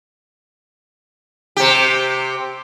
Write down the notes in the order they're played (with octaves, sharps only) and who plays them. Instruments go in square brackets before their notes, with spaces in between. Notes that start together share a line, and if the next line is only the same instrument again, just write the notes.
[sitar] C3 G4